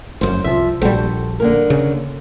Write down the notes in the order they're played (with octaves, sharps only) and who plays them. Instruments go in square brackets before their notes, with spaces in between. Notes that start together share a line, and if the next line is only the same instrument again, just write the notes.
[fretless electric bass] F1 F#2 [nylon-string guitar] C5
[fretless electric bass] C2 [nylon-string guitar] F3 E5
[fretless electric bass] A#1 G3 [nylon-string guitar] F#4 A4 C5
[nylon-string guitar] D3 A#3 A#4
[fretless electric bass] C#3